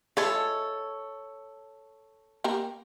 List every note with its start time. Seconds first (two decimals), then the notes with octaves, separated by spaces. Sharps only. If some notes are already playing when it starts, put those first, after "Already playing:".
0.17 G#3 E4 F4 A4 C#5
2.44 A#3 G4 A#4